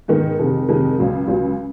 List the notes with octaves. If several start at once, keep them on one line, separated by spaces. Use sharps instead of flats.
G#2 D#3 G#3 B3
F2 C3 D#3 G#3
F2 C3 D#3 G#3
C#2 C#3 F#3
C#2 C#3 F#3